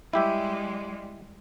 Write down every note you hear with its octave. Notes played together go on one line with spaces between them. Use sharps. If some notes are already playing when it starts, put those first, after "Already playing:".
G3 G#3 E4 G4 E5